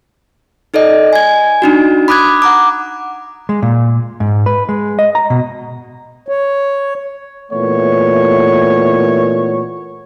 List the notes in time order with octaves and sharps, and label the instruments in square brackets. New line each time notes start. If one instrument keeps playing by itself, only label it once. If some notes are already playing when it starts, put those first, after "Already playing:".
[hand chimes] D#4 A4 D5 D#5
G#5 G#6
D4 D#4 F#4
B5 D6 D#6 F#6 G#6
F#5 A#5 D6
[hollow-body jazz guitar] G#3
A#2
G#2
B4
G#3
D#5
A#5
B2
[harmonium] C#5
[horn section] A#2 E3 A3 B3 C#5